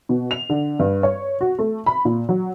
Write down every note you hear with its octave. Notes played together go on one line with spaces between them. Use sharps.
B2
F7
D3
G2
C#5
F#4
A3
B5
A#2
F#3